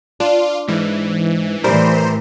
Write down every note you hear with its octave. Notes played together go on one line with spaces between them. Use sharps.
D4 F4
G#2 E3
A2 E3 G3 A#4 C5